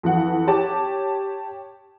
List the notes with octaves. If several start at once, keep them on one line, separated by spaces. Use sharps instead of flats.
F2 E3 F#5
G4 C#5 A5 D6